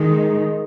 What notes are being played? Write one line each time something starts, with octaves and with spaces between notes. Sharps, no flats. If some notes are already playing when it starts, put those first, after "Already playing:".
Already playing: D#3 G#3 D#4